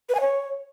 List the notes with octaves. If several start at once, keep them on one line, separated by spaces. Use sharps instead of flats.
B4
G#5
C#5